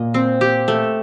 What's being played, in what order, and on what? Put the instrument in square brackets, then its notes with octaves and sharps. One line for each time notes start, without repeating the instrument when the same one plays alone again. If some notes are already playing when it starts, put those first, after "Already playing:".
Already playing: [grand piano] A#2 A#3 [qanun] D#5
[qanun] C4
G4
A3